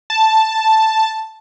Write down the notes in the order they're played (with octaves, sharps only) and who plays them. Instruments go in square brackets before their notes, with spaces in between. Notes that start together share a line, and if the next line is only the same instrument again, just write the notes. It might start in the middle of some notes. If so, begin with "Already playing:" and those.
[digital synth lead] A5